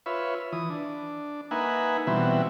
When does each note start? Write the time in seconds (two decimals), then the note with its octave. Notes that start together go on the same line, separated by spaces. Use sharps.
0.06 F4 B4 C#5 E5
0.52 E3 D#6
0.70 D4
1.51 A#3 D#4 B4 E5 F#5 G#5
2.07 B2 E3 G3 C4 F#4 E5